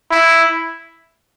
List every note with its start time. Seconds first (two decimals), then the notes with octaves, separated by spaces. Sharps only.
0.11 E4